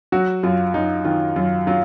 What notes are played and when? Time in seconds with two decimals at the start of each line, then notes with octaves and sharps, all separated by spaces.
0.12 F#3 F#4
0.43 F#2 F4
0.74 F#2 D#4
1.05 D#3 F4
1.36 F#2 F4
1.67 F#3 F4